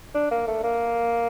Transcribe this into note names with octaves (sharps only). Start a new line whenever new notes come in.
D4
A#3
A3
A#3